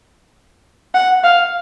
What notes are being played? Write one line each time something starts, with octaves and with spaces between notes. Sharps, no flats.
F#5
F5